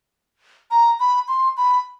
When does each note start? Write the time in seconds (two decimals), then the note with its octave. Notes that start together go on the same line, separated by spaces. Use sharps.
0.71 A#5
1.00 B5
1.28 C6
1.57 B5